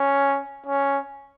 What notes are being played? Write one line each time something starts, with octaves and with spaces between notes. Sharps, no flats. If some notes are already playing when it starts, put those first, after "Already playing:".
Already playing: C#4
C#4